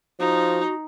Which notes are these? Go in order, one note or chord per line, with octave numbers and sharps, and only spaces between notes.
F3 D#4 F#4